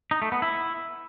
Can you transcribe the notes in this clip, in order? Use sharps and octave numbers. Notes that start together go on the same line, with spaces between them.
D#4
A3
B3
E4